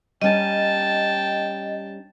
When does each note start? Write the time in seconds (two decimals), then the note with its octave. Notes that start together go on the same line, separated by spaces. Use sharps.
0.22 G3 C#4 D#4 D#5 G5 A5